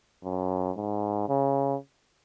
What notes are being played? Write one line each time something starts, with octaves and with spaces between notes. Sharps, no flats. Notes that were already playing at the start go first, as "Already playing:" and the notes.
F#2
G#2
C#3